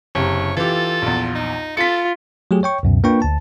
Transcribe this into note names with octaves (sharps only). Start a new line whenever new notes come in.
F#1 C3 C#5
E3 F4 G4 A4
A#1 E2
D#4
F4 A4 B6 C#7
F#3 A3 G4 G#4
C#5 G5 C#6
C#2 F#2 B2
A#3 D4 F4 B4 G5 C#6
D2 A5